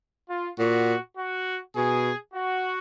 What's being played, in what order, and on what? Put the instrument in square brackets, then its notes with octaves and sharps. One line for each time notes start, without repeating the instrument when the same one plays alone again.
[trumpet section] F4
[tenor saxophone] A#2 [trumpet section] F#4
[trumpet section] F#4
[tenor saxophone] B2 [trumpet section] G#4
[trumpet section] F#4